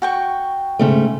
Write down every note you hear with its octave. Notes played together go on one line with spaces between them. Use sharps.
F#4 G5 C#6
G#2 C#3 A3